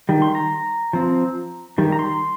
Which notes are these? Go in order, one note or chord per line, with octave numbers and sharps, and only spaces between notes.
D#3 G3
C6
A#5
F3 C4
D#3 G3
A#5
C6